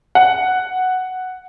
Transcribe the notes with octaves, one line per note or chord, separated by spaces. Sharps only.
F#5